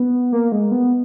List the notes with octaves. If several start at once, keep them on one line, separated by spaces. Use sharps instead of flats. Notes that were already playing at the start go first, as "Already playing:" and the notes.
Already playing: B3
A#3
G#3
B3